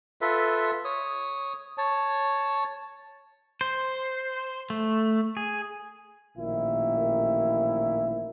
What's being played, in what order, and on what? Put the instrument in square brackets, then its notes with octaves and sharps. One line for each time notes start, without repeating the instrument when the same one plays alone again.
[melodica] F4 A4 B4 E5
C#5 D#6
C#5 A5
[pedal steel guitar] C5
A3
G#4
[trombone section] A1 A#2 D#3 F3 E4